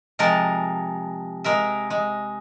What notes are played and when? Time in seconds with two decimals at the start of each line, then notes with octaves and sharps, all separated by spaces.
0.19 C3 F3 G#3 A#4 A5
1.44 G#3 A#4 E5
1.90 G#3